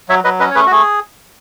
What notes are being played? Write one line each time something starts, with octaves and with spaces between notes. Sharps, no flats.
F#3 C#5 E5
F#3 B4 D#5
C#4 B4 D#5
C#5
A3 G#4 B4
F#4
A3 G#4